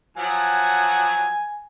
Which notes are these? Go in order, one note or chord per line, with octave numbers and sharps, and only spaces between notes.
F3 F#3 F#5 G#5